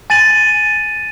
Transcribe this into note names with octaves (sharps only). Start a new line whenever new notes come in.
G#5 A6 D#7 F#7